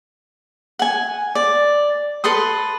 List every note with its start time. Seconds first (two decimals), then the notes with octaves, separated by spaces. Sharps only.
0.79 F#5 G#5
1.35 D5
2.24 A4 B4 C6 D#6